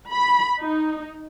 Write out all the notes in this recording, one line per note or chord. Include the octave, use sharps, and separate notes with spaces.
B5
D#4